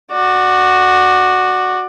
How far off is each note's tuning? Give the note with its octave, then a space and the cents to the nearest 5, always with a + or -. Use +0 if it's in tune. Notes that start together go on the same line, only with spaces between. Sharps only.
F#4 +0 D5 +20